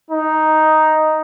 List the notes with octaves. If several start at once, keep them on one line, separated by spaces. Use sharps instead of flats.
D#4